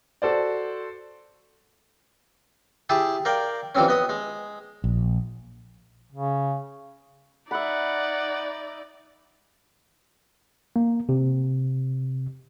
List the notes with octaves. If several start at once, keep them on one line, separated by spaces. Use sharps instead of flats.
F#4 A4 C5 D5
E4 G4 G#4 A5 D#6
A#4 D5 F5 G5
E3 F3 G3 C4 C#4
B3 D#5 D#6
G#3
A#1
C#3
D#4 D5 E5 F#5 B5
A#3
C3